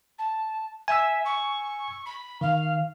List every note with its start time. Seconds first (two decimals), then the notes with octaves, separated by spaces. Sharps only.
0.18 A5
0.88 E5 G#5 E6
1.25 C#6
2.05 B5
2.41 D#3 F5